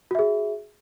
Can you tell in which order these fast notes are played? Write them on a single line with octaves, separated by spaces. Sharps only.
F#4 E5 G#4